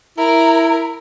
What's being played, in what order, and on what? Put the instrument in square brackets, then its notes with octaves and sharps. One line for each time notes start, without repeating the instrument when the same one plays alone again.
[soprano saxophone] E4 [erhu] A#4